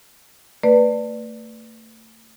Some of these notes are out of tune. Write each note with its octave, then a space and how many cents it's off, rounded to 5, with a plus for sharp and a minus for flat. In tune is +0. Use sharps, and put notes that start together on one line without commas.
A3 +35 B4 +0 D5 +0